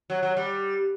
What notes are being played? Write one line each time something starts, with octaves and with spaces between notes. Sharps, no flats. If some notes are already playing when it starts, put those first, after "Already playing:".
F#3
F#3
G3